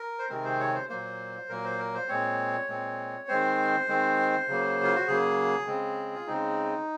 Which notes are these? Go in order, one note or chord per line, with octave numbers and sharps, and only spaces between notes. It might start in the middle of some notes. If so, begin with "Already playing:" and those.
Already playing: A#4
C5
C3 D#3 G#3 C4 A#4
C5
C#5
C5
A#2 F#3 A#3 C5
A#2 F#3 A#3 A#4
C5
A#4
C5
A#2 G#3 C4 C#5
A#2 G#3 C4
D#3 G#3 C4 C5
D#3 G#3 C4
C#3 F#3 A#3
F4
F#4
C#3 F#3 A#3 G#4
C#3 G#3 C4
F4
C#3 G#3 C4 D#4